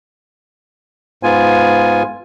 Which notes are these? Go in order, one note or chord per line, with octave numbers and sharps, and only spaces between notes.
G#2 B3 F4 G#5